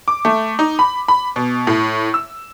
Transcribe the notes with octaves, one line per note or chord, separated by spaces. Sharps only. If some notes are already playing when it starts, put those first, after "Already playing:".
D6
A3
D#4
B5
B5
B2
A2
E6